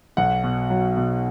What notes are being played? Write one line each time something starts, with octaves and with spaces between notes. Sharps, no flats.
B1 F#5
B2
F#3
B2